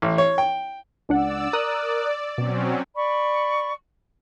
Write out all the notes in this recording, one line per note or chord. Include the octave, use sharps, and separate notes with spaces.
A1
C#5
G5
C#2 D4 D5 F#5 E6
A#4 D5 D#6 F#6
B2 F#3 C4 C#4
D5 B5 C#6